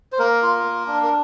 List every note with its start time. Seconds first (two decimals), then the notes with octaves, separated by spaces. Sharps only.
0.12 C5
0.19 A#3 A#4
0.42 F4
0.64 A#3
0.87 D4
1.03 A#4